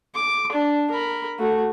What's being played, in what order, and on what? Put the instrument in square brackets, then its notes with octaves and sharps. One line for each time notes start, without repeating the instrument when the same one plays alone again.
[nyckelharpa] D6
D4
A#4 B5
A3 F#4